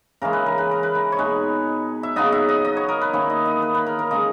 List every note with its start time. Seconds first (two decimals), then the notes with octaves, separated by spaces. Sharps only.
0.22 C#3 E3 G#3 A#4
0.33 B4
0.46 A#4
0.58 B4
0.71 A#4
0.83 B4
0.95 A#4
1.12 C#5
1.18 B2 G#3 D#4 B4
2.03 E5
2.16 C#3 F#3 B3 D#4 D#5
2.32 E5
2.49 D#5
2.65 D#5
2.77 C#5
2.89 A#4
3.01 B4
3.13 D#3 A#3 C#4 E4 B4
3.30 D#5
3.45 D#5
3.62 B4
3.75 B4
3.86 A#4
3.99 A#4
4.11 C#3 G#3 D#4 D#5